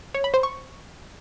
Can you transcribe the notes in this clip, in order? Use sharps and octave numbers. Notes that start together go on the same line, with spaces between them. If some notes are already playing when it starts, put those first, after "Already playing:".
C#5
B5
C5
C#6